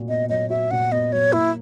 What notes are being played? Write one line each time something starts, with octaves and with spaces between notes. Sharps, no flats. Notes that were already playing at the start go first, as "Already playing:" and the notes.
Already playing: A#2 F#4
B3 D#5
F#3 D#5
F#4 E5
A#2 F#5
B3 D#5
F#3 C#5
A#3 E4